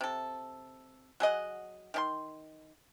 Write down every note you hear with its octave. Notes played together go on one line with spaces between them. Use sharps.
C3 A4
F#3 G#4 D#5 F#5
D#3 G4 C6